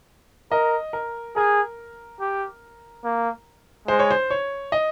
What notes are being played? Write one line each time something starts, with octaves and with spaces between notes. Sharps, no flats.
A#4 D#5
A#4
G#4 A#4
G4
A#3
G#3 C5
C#5
C5
C#5
D#5